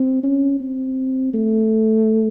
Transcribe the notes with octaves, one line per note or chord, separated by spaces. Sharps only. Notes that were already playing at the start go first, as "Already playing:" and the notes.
Already playing: C4
C#4
C4
A3